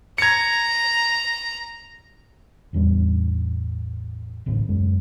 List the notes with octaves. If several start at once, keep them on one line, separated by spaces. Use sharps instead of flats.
A#5 G#6 C#7
A1 E2 G3 D4
D1 A1 C#3
F#2 C#3 G#3